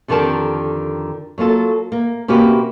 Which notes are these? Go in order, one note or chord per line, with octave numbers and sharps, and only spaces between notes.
F2 D3 D#3 G4 A#4 A5
F#3 A#3 F4 A4
A#3
C3 A#3 C#4 F#4 G4 B4